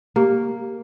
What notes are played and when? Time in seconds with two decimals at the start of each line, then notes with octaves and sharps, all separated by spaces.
0.16 A#3 G4